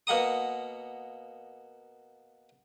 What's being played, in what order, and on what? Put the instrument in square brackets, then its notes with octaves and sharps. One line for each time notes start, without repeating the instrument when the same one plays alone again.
[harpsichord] B2 A#3 F#5 A#5 D#6